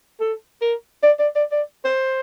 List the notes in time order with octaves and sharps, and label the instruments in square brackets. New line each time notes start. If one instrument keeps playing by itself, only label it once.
[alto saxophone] A4
A#4
D5
D5
D5
D5
C5